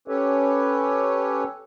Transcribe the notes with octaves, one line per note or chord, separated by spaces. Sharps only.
C#4 G4 A4 B4 C#5